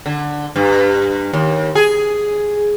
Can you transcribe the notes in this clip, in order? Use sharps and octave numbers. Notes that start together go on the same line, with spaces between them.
D3
G2
D#2
G#4